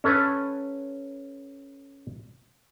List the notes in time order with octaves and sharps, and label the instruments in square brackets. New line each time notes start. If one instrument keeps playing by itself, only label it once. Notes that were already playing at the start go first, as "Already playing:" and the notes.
[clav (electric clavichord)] C#4 A4 B4